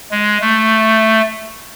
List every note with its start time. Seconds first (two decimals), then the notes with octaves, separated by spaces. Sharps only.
0.11 G#3
0.41 A3